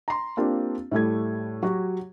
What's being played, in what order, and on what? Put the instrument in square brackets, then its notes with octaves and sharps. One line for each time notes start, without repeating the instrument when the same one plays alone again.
[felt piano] A#5 C6
A#3 C4 D4 F4 G4
A2 G3 A3 G#6
F#3 F#4 G4